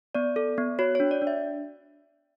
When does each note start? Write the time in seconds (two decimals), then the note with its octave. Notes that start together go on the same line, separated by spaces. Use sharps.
0.15 B3 D5
0.36 A4
0.58 B3
0.79 F#4 C#5
0.95 D4 C#5
1.11 D5
1.22 D4
1.27 E5